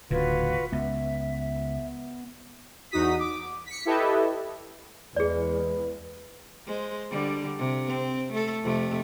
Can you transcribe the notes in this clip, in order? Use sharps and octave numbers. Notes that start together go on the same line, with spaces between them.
D#1 D2 A2 C#3 F4 F#4 B4
C#2 B3 E5
E2 D#4 F#4 D#6 B6
D6
B6 C#7
E4 G4 A4 B4 D#5 E5
E2 G#3 G#4 B4 D5
G#3 C5
D3 G3
C3
C4
A3 A4
F2 C3 A3